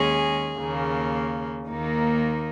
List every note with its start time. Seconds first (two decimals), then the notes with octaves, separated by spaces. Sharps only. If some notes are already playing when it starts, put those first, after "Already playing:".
Already playing: D#2 D#3 G#3 C#4 G#4
0.58 D#2 C#3 A#3
1.69 D#2 D#3 A#3 D#4